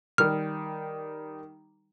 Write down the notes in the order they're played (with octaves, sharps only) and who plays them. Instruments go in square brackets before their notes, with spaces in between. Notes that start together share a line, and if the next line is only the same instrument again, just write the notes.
[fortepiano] D#3 G3 [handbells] F6